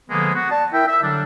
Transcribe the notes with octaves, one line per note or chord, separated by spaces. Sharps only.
D3 F3 G#3 A#3 B3
B3 F#4
D5 A5
E4 A#4 E5 G5
E5
D3 F#3 G3 D4